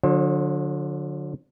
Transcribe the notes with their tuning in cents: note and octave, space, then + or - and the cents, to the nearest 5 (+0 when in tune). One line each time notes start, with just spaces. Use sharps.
D3 +0 F#3 -40 C5 +30